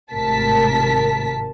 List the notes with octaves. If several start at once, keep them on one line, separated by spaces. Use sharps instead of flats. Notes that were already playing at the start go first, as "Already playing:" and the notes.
G#1 A2 C3 A#4 A5 B6